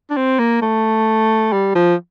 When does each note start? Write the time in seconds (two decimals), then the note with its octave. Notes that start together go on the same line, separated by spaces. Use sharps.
0.10 D4
0.17 C4
0.39 A#3
0.62 A3
1.53 G3
1.75 F3